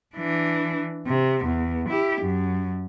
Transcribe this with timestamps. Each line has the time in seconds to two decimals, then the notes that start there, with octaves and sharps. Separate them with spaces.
0.16 E3 D4
1.07 C3
1.45 E2
1.89 E4 G4
2.21 F#2